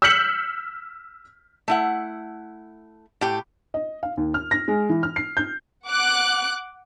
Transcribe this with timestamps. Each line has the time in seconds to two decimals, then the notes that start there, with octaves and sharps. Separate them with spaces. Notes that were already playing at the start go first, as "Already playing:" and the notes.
0.02 E6 F6 G6 B6 C#7 F#7
1.68 A3 E4 F#5
3.21 A2 G4
3.74 D#5
4.03 F5
4.17 D#2
4.34 F6
4.51 A#6
4.68 G#3
4.90 E3
5.03 F6
5.16 C7
5.37 G6
5.88 F#5 D6 F#6